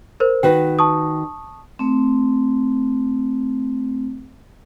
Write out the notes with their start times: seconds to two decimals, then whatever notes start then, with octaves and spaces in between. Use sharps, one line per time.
0.20 A#4 C5
0.43 D#3 F#4 B4 G5
0.79 A5 C#6 D#6
1.79 A3 C4